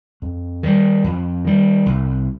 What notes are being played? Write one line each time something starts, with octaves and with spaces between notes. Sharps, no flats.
F2
D#3 G3
F2
D#3 G3
C2